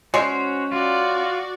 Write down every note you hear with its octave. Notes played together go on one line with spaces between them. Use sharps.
G#3 C#4 F#4 C5
F4 F#4 D5